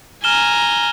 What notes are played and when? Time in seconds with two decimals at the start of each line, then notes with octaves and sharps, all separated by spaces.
0.24 G#5 A#5 F6 E7 G7